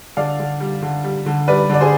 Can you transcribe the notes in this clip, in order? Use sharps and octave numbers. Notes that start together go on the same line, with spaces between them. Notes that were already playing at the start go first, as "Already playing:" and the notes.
D3 D5 F5
D3
G3
D3
G3
D3
G3 B4 D5
D3 D5
G#4 C5